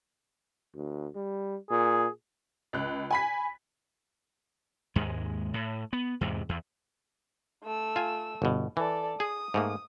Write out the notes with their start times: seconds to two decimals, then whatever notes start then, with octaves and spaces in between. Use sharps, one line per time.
0.75 D2
1.15 G3
1.70 A#2 G#4
2.73 C#2 F#6
3.11 G#5 B5 B6
4.96 D#2 G#2 G#3
5.54 A2
5.93 B3
6.21 E2 G#2 C3
6.49 E2
7.64 A3 E6
7.96 F4 G#5
8.42 G1 B2
8.77 E3 A4 D5
9.20 G#4 D#6
9.54 G#2 A3 A#3